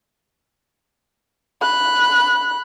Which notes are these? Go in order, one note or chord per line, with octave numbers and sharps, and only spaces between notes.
B5 F#6